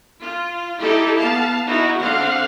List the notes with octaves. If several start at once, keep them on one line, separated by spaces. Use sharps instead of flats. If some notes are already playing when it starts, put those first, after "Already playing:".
F4
D#4 E4 G4 A4
B3 F5 A5
D#4 E4 F#4
D3 C4 F5 F#5